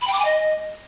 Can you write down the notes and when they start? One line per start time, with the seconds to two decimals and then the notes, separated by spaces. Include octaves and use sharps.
0.01 B5
0.07 G5
0.13 D6
0.19 G#5
0.25 D#5